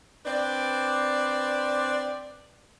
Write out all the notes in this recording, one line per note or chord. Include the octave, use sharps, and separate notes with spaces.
C4 D4 B4 D5